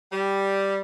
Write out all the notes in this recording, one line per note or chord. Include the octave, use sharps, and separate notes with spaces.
G3